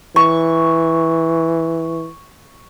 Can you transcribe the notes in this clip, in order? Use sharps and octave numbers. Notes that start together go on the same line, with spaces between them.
E3 C#6